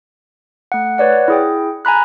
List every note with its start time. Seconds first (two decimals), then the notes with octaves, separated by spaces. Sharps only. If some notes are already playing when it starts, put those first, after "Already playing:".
0.72 A3 F#5
0.98 B4 C#5 D5 F#5
1.28 E4 G#4 G5
1.85 G#5 A#5 B5 F#6